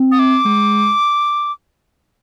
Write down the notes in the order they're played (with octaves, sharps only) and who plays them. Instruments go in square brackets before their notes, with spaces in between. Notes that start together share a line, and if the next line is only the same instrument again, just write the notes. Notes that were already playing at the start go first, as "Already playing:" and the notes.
Already playing: [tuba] C4
[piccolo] D#6
D6
[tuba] G#3